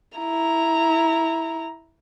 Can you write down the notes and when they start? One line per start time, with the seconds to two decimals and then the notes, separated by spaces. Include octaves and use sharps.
0.18 E4 A#5